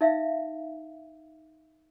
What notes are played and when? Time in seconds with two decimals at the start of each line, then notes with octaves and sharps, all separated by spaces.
0.01 D#4 E5 F5